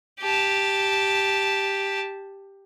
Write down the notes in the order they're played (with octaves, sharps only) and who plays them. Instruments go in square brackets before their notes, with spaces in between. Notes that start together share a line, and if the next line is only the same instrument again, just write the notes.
[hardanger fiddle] G4 A5